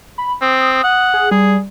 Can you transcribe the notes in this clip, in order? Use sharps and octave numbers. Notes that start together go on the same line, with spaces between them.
B5
C4 D#6
F#5
G#4
G3 G#4